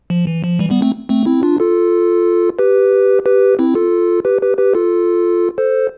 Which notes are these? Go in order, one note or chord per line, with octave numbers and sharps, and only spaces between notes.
F3
E3
F3
E3 G3
G3 B3
A3 C4
A3 C4
C4 E4
D4 F4
F4 A4
G4 B4
G4 B4
C4 E4
F4 A4
G4 B4
G4 B4
G4 B4
F4 A4
A4 C5